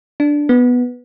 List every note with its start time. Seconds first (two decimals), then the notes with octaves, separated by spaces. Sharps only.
0.20 D4
0.49 B3